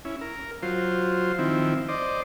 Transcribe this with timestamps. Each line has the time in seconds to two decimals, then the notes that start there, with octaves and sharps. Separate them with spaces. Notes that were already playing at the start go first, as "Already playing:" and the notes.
0.05 C#4 E4
0.21 A#4
0.62 F#3 F4 C5
1.39 D#3 F3 C4 E4
1.88 C5 D5 D#5